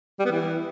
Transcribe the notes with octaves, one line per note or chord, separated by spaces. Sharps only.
G3
B3
E3